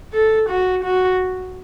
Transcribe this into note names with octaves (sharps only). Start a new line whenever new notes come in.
A4
F#4
F#4